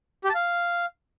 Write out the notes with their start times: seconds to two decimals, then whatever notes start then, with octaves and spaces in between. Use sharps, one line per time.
0.24 G4
0.30 A5
0.35 F5